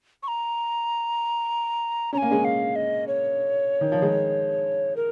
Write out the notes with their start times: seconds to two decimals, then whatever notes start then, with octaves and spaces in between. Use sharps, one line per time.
0.23 C#6
0.28 A#5
2.13 C#4 A#5
2.18 A#3 G#5
2.31 G#3 C#4
2.45 F5
2.76 D#5
3.07 C#5
3.81 D#3
3.92 F3
4.02 D#3 G#3
4.96 A#4